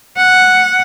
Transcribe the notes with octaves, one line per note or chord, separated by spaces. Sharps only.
F#5